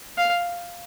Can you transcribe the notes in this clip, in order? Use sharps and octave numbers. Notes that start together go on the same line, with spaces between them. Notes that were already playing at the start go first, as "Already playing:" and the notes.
F5